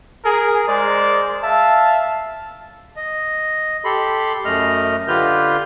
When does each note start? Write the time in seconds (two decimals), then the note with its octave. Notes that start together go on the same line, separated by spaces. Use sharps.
0.25 G#4 A#4
0.68 G#3 A#4 C5 D5
1.43 E5 F5 A5
2.97 D#5
3.85 G4 A4 B5 C6
4.45 F#2 A3 D#5 F6
5.08 D3 F4 G4 B4 F6 G6